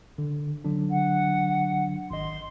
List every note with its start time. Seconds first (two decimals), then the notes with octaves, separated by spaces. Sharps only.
0.18 D3
0.65 D3 F#3 D4
0.90 F#5
2.11 G#1 D#5 C6